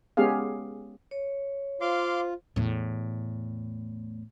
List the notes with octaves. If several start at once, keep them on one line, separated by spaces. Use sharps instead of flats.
G#3 B3 C#4 G4 G#4 F5
C#5
F4 C5 F5 C6 D6
E2 A2